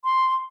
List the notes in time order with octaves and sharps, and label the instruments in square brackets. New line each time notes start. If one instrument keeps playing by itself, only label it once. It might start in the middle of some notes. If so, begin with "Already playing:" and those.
[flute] C6